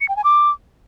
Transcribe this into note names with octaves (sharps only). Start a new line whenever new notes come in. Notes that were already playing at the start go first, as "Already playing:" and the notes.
C#7
G5
G#5
D6